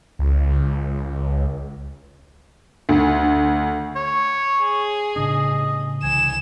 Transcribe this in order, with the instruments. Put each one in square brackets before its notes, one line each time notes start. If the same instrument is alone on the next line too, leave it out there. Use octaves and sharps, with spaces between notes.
[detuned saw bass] C#2
[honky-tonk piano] D2
[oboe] C#5
[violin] G#4
[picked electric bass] A2 C#3 D4 [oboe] D#5
[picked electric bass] C2 E3 [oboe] G#5 [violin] E7